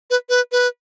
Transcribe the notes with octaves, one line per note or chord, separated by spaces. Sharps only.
B4
B4
B4